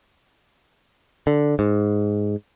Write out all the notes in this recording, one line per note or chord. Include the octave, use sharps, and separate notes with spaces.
D3
G#2